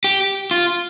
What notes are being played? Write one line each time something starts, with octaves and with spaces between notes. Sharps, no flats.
G4
F4